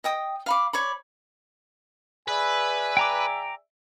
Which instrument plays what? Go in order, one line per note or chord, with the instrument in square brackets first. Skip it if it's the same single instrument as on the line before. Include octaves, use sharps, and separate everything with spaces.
[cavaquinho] D#5 G5 D#6
F5 B5 D6
C#5 D5 B5
[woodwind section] G#4 D5 E5 [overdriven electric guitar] B4 [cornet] G#5
[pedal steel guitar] G5 A#5 D6